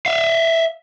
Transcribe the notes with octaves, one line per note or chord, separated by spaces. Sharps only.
E5 F5